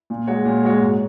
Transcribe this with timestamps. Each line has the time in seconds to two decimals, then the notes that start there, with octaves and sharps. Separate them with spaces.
0.10 A#2
0.28 G#3 F#4 C#5
0.45 A#2
0.63 G#3 F#4 C#5
0.81 G#2